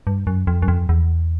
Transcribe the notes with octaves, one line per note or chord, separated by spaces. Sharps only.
G2
F#2
F2
F#2
F2
E2